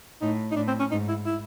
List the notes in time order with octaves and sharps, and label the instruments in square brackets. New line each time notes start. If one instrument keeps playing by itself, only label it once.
[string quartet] A2 [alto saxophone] D#4
[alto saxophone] D#4
[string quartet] A2 [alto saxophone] D4
[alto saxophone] C4
C#4
[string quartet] G#2 [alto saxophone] D#4
[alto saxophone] E4
E4